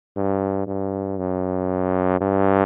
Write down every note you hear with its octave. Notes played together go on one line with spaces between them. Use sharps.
G2
G2
F#2
G2